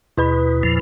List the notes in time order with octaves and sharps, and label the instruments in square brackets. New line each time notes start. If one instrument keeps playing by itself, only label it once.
[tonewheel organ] D#2 B2 [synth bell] E4 B4 B5
[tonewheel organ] E2 A#2 F3